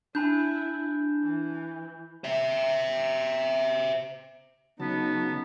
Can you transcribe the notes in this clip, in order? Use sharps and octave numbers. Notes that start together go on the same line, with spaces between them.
D4 E4 G#5 B5 G6
E3
C5 E5
C#3 F#3 B3 D#4 A5